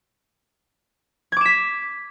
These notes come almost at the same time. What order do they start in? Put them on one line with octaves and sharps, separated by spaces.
G#6 D6 E7 B6